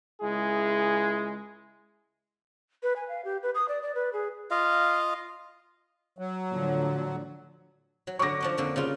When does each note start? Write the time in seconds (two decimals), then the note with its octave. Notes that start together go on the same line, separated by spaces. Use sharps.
0.22 C#2 G#3 E4 G#4
2.83 B4
2.96 G#5
3.09 F5
3.25 G4
3.43 B4
3.55 D#6
3.69 D5
3.82 D5
3.95 B4
4.13 G#4
4.51 F4 D#5 F5
6.18 F#3
6.52 A2 D3 F3
8.07 F#3
8.19 D3 F#3 C#6 D6 A#6
8.40 F3 D4 D#5
8.58 F2 D3 A#3
8.76 C#3 G3 F4